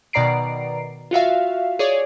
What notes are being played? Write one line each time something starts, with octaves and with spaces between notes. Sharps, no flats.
B2 D#3 D5 A#5 C7 D7
F4 F#4 E5 F5
G#4 C#5 D5